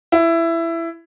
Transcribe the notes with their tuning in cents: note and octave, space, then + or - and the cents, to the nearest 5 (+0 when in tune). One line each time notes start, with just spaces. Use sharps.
E4 +15